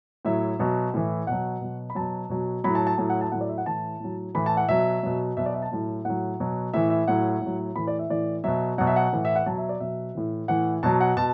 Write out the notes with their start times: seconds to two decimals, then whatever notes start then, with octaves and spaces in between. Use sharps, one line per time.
0.25 A2 F#3 E5
0.59 B2 F#3
0.94 A2 E3
1.27 B2 F#3 F#5
1.61 B2 F#3
1.90 B5
1.95 B2 F#3 A5
2.29 B2 F#3
2.64 F#3 B5
2.67 A2
2.75 A5
2.87 A5
2.98 A2 F#3 A5
3.10 F#5
3.21 A5
3.32 A2 F#3 F#5
3.41 D5
3.49 E5
3.58 F#5
3.66 A2 E3 A5
4.00 A2 F#3
4.35 A2 E3 B5
4.46 A5
4.57 F#5
4.69 B2 F#3 E5
5.03 B2 F#3
5.37 B2 F#3 E5
5.46 D5
5.54 E5
5.62 A5
5.72 A2 F#3
6.05 A2 F#3 F#5
6.40 B2 F#3
6.74 A2 E3 E5
6.90 E5
7.08 A2 F#3 F#5
7.41 A2 F#3
7.75 A2 E3 B5
7.87 D5
7.99 E5
8.10 A2 E3 D5
8.44 B2 F#3 E5
8.78 B2 F#3 F#5
8.87 E5
8.96 F#5
9.13 A2 E3
9.25 E5
9.36 F#5
9.46 B2 F#3 A5
9.58 E5
9.69 D5
9.80 B2 F#3 E5
10.15 A2 E3
10.48 A2 E3 F#5
10.83 B2 F#3 A5
11.01 F#5
11.17 B2 A5